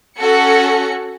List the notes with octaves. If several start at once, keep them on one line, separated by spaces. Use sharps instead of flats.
C#4 F#4 A4 C#7